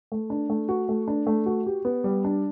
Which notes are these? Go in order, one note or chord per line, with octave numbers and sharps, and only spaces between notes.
A3
D4
A3
F#4
A3
D4
A3
F#4
G4
B3
G3
D4